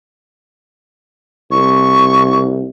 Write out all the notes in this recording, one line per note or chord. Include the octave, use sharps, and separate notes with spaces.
C2 C#6